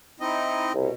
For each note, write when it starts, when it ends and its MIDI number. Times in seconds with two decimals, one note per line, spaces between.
0.20 0.73 60
0.20 0.72 63
0.20 0.72 64
0.20 0.73 75
0.74 0.88 36
0.74 0.94 47